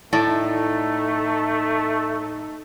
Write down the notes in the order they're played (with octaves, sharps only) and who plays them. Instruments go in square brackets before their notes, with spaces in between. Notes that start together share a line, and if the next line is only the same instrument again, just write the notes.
[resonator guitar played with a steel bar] A2 D5 A5 [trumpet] A3 [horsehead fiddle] D#4 A4